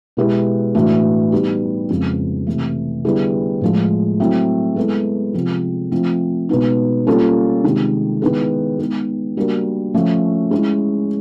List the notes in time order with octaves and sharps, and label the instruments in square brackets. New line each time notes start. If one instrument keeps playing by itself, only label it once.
[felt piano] B2 G#3 B3 E4 G4
A2 E3 A3 D4 F#4
G3 B3 D#4 G4
F2 C#3 F3 G#3 B3
C3 E3 A3
D3 G3 B3 E4 G#4
A2 F3 G#3
F#3 A3 C4 E4
G#3 B3 E4 A4
C3 F3 G#3 C4 F4
F3 A3 C4 F4
B2 G#3 B3 D#4
G3 A#3 C#4 F4 A4
C3 D#3 G#3
D#3 G#3 B3 E4 G#4
G#3 B3 D#4
G3 A#3 D4 F#4 A#4
F3 A3 C#4
G#3 C#4 E4